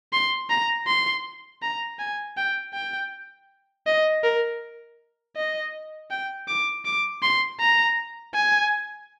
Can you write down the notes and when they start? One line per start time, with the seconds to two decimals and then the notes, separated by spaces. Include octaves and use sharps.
0.13 C6
0.50 A#5
0.87 C6
1.62 A#5
1.99 G#5
2.37 G5
2.74 G5
3.87 D#5
4.23 A#4
5.36 D#5
6.11 G5
6.48 D6
6.85 D6
7.23 C6
7.61 A#5
8.34 G#5